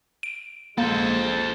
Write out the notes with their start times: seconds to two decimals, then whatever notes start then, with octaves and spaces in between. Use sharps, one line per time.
0.23 D7
0.78 A#1 G#3 A#3 A4 C5